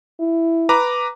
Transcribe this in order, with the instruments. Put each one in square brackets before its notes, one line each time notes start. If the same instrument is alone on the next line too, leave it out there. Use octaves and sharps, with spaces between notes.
[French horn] E4
[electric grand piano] B4 A#5 D6